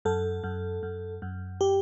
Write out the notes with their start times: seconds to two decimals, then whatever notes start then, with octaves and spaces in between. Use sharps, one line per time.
0.05 F#2 A4
0.44 F#2
0.83 F#2
1.22 F#2
1.61 G4